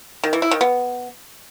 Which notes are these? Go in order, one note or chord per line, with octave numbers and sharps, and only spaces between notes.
D#3
E3
E4
D#3
B3